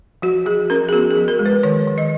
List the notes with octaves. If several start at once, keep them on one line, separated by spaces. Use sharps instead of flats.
F3 F#4
F3 G#4
C#4 A#4
G#4
B3 F#4
G#4
F3
A#4
G#3
B4
D#3 C#5
D#3
D#5